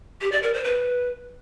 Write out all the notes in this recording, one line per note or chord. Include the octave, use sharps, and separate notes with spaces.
G4
D5
A#4
C5
B4